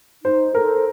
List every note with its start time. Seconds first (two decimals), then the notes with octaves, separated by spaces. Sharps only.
0.24 D#4 C5
0.54 A4 A#4 C5